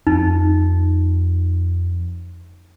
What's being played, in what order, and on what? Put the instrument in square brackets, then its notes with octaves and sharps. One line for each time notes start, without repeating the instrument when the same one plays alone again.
[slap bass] F2 [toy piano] D#4